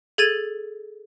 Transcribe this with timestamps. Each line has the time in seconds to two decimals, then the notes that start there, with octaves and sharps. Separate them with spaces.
0.18 G#4 A4 G#6 A6 D#7